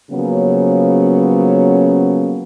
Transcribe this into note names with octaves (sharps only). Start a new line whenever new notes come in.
C#3 F3 F#3 A#3 B3 C#4